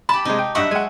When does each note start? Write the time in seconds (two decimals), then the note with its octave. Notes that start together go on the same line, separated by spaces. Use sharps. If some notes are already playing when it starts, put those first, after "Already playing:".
0.09 G4 A5 B5
0.25 C3 G#3 D#4
0.39 G5
0.55 G2 F#3 D#5 E5 F#5 C#6
0.71 G#3 F#5 G#5